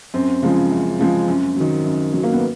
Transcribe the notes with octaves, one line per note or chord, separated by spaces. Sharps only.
F#2 C4
C#3 F3 G#3
F#2
C#3 F3 G#3
F#2
D#3 F#3
F#2
D#3 F#3
A#3
B3